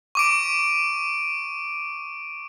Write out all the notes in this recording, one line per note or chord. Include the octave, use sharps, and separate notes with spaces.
C#6 D6 D7